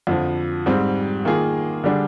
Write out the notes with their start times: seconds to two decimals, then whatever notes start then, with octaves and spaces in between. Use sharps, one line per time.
0.07 F2 D3 F3
0.66 G#2 G3 C4 G4
1.25 D#3 A#3 F4 G#4
1.84 D3 G3 D4 G#4